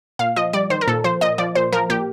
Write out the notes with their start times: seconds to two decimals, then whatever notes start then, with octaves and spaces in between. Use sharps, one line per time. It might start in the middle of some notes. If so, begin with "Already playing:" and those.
0.19 A#2 F5
0.36 F3 D#5
0.53 G3 D5
0.70 D#3 C5
0.81 A#4
0.88 A#2 A4
1.04 F3 C5
1.21 A#2 D#5
1.38 F3 D5
1.55 A#2 C5
1.73 F3 A#4
1.90 A#2 G4